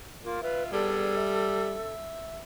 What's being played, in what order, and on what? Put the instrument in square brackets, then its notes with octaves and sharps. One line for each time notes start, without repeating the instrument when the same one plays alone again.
[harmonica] A#3 [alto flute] F4
[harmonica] F4 E5 [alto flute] B4
[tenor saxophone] G3 [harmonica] B3 D4 G#4 [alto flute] A4
[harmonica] E5